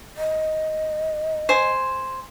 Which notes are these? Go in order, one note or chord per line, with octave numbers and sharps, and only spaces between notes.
D#5
C5 G#5